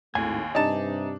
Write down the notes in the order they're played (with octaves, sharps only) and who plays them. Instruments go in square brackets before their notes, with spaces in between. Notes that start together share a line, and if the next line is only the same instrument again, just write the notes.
[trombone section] G#1 A2 A3 [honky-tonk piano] D#2 [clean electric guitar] G#5
[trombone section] G2 C3 [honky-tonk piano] D4 [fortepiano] D#4 A5